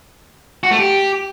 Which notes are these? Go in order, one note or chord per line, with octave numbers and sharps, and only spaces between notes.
F#4
A3
G4